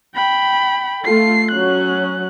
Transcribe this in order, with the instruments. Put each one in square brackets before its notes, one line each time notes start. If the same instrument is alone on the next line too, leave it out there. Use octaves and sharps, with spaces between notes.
[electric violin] G5 B5
[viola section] A3 F4 A4 [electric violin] C7
[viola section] F#3 C#4 [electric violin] F#6